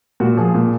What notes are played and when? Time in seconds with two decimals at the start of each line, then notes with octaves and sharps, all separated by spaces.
0.20 A#2 F#4
0.37 F3 G#4
0.54 A#2